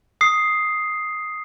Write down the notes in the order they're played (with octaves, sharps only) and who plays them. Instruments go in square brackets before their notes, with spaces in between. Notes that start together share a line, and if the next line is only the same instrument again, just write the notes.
[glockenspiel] D#6 C7